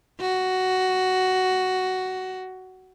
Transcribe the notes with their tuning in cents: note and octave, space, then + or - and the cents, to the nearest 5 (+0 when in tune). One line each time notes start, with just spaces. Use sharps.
F#4 +10